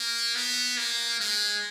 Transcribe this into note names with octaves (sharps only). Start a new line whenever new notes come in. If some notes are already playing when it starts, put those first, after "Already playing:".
Already playing: A#3
B3
A#3
G#3